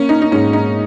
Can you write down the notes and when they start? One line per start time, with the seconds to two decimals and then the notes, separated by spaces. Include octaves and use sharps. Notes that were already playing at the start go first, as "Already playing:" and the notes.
Already playing: A#3 C#4
0.09 D#4
0.22 D#4
0.31 G#2 C#4
0.53 D#4